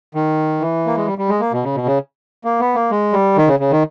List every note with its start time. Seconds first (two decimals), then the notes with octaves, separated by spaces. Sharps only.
0.15 D#3
0.60 E3
0.86 A#3
0.97 G#3
1.06 G3
1.18 G3
1.29 G#3
1.40 A#3
1.52 B2
1.64 C#3
1.75 B2
1.86 C#3
2.44 A#3
2.60 B3
2.75 A#3
2.91 G#3
3.13 G3
3.37 D#3
3.48 C#3
3.60 C#3
3.71 D#3